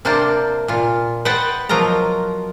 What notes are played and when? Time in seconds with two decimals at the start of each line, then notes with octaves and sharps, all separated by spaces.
0.05 C3 A#3 D4 C5 G5 A5
0.68 A#2 F4
1.25 B4 C5 D#5 F#5 G5 A5
1.69 B2 F3 F#3 F4 A#4 A#5